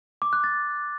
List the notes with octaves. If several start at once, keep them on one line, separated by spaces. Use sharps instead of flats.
D6
F#6
A6